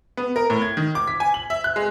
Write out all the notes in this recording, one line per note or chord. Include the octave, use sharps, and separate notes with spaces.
B3
A#4
A2
G#6
D#3
D6
B6
G#5
F#7
E5
F#6
G#3